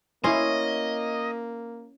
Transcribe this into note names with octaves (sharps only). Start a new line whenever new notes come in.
A#3 C#4 E4 C#5 D#5 C6